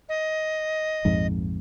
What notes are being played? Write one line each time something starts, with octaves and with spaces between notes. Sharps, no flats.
D#5
A#1 F2 G#2